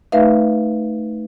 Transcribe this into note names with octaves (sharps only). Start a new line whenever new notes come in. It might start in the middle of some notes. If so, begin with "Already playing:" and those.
A3 D#4 B4 E5 F5